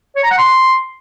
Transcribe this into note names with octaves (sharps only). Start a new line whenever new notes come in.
C#5
A#5
F#5
C6